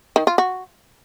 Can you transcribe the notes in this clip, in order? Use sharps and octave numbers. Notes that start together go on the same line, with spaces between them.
D#3
F4
F#4